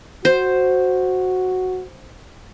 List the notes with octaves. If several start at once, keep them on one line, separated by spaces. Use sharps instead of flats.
F#4 C5